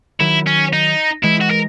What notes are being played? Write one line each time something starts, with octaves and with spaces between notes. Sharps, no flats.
D#3 F#3 E4
C#4
D#4
E3 G#3 E4
F#4
A#4